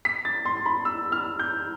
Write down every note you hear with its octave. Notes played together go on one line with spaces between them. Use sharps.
B6
A6
C6
C6
B5
E6
F6
G6